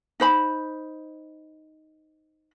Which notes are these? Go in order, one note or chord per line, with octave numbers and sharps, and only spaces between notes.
D#4 C5 B5